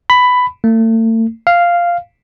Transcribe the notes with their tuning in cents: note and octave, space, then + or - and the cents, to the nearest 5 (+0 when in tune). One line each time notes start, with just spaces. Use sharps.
B5 +10
A3 +40
F5 -5